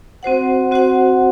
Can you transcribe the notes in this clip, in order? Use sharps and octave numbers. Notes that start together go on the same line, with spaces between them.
C4 F#4 C5 F#5
C4 F#4 C5 F#5